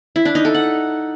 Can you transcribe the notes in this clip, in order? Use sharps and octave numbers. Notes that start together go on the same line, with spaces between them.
E4
D4
D#4
A4
F#5